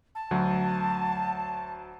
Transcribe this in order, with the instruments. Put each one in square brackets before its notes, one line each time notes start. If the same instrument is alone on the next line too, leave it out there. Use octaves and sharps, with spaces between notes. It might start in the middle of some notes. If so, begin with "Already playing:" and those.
[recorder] A5
[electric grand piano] D2 F#3